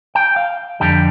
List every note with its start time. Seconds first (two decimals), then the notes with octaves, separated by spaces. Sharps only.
0.15 G5
0.36 F5
0.80 F2 D3 G3 G5